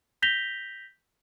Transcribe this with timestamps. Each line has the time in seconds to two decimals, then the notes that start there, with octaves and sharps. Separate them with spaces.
0.22 G6 A#6 B6 F7 G7